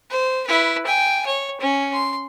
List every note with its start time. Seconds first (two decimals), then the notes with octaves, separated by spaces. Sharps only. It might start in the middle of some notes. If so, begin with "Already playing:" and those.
0.10 C5
0.47 E4 B4
0.86 G5 G#5
1.26 C#5
1.61 C#4
1.93 C6